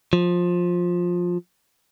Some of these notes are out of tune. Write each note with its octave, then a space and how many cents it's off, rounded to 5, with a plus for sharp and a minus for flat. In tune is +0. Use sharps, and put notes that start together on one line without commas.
F3 +15